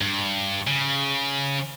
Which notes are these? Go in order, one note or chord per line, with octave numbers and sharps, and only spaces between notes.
G2
C#3